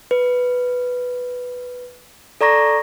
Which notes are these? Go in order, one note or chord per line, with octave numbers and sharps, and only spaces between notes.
B4
A4 D5 A#5 C#6 A#6